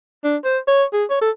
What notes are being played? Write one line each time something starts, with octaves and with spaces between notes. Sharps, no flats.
D4
C5
C#5
G#4
C#5
A4